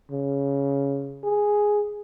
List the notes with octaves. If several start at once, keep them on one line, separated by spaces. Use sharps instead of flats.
C#3
G#4